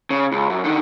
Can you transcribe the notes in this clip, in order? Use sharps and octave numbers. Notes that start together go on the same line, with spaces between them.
C#3
C#2
F#2
D3 D#3